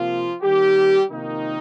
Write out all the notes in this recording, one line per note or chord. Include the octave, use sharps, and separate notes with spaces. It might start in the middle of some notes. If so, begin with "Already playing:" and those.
Already playing: C3 F3 A#3 F4
D#3 G3 A#3 G4
C3 D#3 F3 A#3 D#4